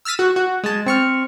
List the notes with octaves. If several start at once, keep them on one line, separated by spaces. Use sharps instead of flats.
E6 F6 A6 B6 D#7
F#4
F#4
G#3 A5
C4 C#6 F6